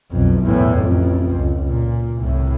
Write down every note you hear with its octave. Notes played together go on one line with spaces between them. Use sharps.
B1 F2
E2 A2
A1 F2
C#2
A#2
C2 A2